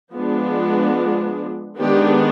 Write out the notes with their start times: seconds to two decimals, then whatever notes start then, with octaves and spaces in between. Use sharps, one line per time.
0.13 F3 G#3 B3 D4
1.79 D#3 G#3 B3 D4 G4